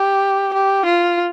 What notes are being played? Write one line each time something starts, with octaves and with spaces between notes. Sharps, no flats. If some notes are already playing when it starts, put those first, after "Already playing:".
Already playing: G4
G4
F4